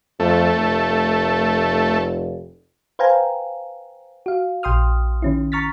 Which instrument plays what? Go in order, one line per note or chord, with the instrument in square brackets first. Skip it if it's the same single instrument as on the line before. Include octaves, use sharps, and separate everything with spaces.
[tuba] F2 [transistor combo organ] A3
[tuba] F1
[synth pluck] B4 C5 F5 G5 G#5 A#5
F#4 F5
A#1 G5 C6 D#6 F6
D#3 C#4 E4
A#5 C#6 F6 A6 B6